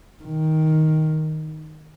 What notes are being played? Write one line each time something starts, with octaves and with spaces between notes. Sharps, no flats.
D#3